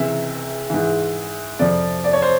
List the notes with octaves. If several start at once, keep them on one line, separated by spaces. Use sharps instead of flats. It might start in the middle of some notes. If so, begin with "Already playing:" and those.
Already playing: C#2 C3 E3 E5
G#2 E3
F2 C3 F3 D5
D5
C#5
C5